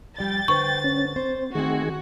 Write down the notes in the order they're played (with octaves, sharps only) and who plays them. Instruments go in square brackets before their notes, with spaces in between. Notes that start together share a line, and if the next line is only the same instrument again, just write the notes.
[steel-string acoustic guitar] F3 G3 D5 [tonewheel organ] G5 [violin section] A6
[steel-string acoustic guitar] D3 B4 C5 [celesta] C#6
[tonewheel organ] C#4
[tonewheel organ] C4 [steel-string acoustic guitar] C5
[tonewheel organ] D#3 G#4 [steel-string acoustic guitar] A3 C4 [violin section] F#4